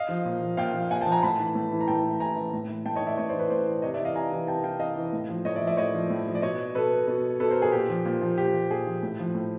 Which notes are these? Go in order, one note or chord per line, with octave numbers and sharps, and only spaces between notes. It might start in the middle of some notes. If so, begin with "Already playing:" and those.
Already playing: D#5 F5
F3
A#2
F3
A#2 F5 G5
F3
A#2 F#5 G#5
G5 A5
F3
G#5 A#5
A2 A5 B5
E3
A2
E3
A#5
A2 G5 A5
E3
A2 G#5 A#5
E3
A2
E3
A2 G5 A5
C#5 D#5
E3
D5 E5
A2 C#5 D#5
C5 D5
E3
B4 C#5
A2 C5 D5
E3
C3 C#5 D#5
D5 E5
E3
D#5 F5
C3 G#5 A#5
E3
C3 G5 A5
E3 F5 G5
C3 D#5 F5
E3
A2
F3
A2 C#5 D#5
D5 E5
F3
D5 E5
A2 C#5 D#5
F3
A2
F3
D5
B2 C#5 D#5
B2 A4 B4
B2
B2 A4 B4
A#4 C5
G#4
A#2 G4
F3
A#2
F3
A#2 G4
F3
A#2 G#4
F3
A2
F3
A2